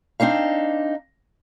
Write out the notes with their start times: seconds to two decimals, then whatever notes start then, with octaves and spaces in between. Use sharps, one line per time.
0.20 C4 D4 D#4 F5